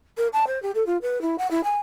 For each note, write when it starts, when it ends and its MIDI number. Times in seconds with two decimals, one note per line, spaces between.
0.17 0.28 70
0.33 0.45 81
0.47 0.61 72
0.62 0.71 67
0.75 0.86 69
0.86 0.97 65
1.02 1.21 71
1.22 1.36 64
1.38 1.50 78
1.51 1.60 64
1.64 1.79 80